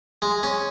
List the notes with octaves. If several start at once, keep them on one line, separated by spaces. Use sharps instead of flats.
G#3
C#4